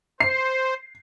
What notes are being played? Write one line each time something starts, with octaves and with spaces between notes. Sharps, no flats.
C5 C7